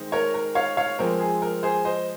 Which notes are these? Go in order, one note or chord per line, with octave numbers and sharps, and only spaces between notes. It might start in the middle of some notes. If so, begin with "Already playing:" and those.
Already playing: D#3 G#3 C4 D#4
A#4 C#5
A#4
C#5 F5
C#5 F5
F3 G#3 C4 A#4
G#4
A#4
G#4 C5
C5 D#5